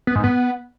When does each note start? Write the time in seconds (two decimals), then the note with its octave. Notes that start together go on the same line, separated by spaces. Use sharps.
0.07 B3
0.15 G#2
0.24 B3